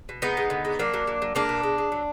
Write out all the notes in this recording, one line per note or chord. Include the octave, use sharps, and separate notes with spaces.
B2
G#3 B3 D#4
G#3
D3
G#3
F#3 A#3 D4
F#3
F#3
F#3
G#3 A#3 D4
B2
G#3
G#3
F#3